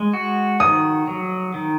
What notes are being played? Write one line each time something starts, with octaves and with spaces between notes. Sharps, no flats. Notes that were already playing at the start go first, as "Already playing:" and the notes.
Already playing: G#3
F#4
D#3 D#6
F#3
D#3